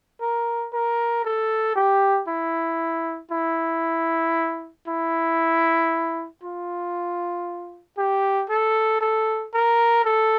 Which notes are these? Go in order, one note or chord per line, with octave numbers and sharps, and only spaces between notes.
A#4
A#4
A4
G4
E4
E4
E4
F4
G4
A4
A4
A#4
A4